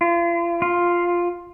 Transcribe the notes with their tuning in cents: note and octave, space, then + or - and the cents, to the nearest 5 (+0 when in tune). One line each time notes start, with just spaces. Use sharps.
F4 -35
F4 +5